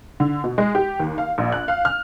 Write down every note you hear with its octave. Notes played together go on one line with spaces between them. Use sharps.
D3
B2
G#3
G4
D#2
F5
A#1
F#6
F5
F6